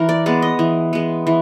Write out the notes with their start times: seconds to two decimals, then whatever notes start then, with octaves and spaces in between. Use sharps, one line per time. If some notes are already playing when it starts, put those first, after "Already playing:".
Already playing: E3 A#4
0.09 D5
0.26 G#3 B3 D5
0.42 D#5
0.59 E3
0.93 G#3 B3
1.27 E3